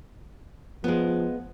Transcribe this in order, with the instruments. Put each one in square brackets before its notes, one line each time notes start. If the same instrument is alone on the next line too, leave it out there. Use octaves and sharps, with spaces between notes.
[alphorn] F3 [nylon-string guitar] G#3 B3